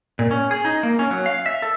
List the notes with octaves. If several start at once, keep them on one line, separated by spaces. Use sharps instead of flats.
A#2
C#4
G#4
D#4
A#3
C#4
F#3
F5
E5
A4